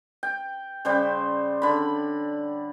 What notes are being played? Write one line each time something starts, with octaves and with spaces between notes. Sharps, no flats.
G5
C#3 G3 C5 G5
D3 B5